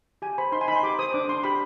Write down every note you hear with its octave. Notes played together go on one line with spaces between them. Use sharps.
G4 G#5
C5 B5
D#4 C6
G#5
D#4 B5
C6
G4 D6
C5 D#6
D4 D6
D4 C6
G4 B5